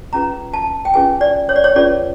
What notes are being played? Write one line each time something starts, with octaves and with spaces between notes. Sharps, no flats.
C#4 F4 G#4 B4 A#5
A5
G5
C#4 F4 G#4 B4 G#5
D5
C#5
D5
C#5
C#4 F4 G#4 B4 D5